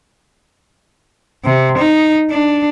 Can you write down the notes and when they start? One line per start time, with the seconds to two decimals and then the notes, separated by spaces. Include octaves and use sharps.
1.44 C3
1.77 D#4
2.30 D4